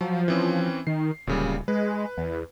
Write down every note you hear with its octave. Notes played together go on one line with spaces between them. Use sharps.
F3 F#3
E3 C4 C#4
D#3 C7
D1 A#2 C#3 G3
G#3 B4
E2